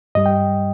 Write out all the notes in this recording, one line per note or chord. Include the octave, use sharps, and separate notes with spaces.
G2 G3 D#5
G5